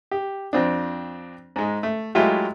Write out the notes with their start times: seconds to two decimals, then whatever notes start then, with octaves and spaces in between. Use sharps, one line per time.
0.11 G4
0.53 F2 C4 D4
1.56 G#2 G#3
1.83 A3
2.15 F#3 G#3 A3 E4 F4 G4